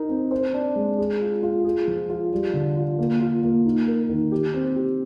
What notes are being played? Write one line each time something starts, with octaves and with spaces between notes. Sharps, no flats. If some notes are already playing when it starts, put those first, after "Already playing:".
Already playing: D#4 A#4
C4
C5
D4
G#3
G#4
F4
F4
G#4
F3
F4
G3
D3
F4
A#3
F4
A#3
D#4
A#4
D#3
G4
C4
G4